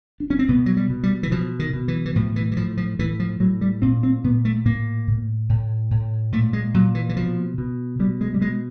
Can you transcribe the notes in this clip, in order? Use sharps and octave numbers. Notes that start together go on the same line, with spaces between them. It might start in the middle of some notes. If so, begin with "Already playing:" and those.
D4
C#4
C4
B2 B3
F#3
G3
B2
G3
E3
B2 F3
D#3
B2
E3
E3
A2 F3
E3
E3
A2 F3
F3
A2 E3
F3
A2 F#3
G3
A#2 C4
C4
A#2 B3
A3
A2 A#3
A2
A2
A2
A#2 A3
G#3
A#2 F#3
E3
E3
B2 F3
B2
B2 G3
G#3
G3
B2 G#3